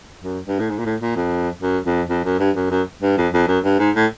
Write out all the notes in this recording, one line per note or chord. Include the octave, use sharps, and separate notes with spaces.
F#2
G2
A2
G#2
A#2
A2
A#2
F2
F#2
F2
F2
F#2
G2
F#2
F#2
G2
F2
F2
F#2
G2
G#2
A2